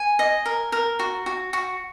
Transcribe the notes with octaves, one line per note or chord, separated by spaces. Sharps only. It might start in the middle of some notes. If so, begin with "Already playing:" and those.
Already playing: G#5
D#5
A#4
A#4
F#4
F#4
F#4